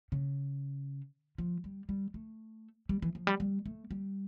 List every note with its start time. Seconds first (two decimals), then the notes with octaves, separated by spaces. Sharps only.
0.12 C#3
1.38 F3
1.64 G3
1.89 G3
2.14 A3
2.89 G3
3.02 E3
3.15 F3
3.27 G3
3.40 G3
3.66 A3
3.91 G3